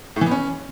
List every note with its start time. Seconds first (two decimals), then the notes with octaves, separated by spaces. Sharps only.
0.16 A2
0.21 E3
0.26 B3
0.31 C#4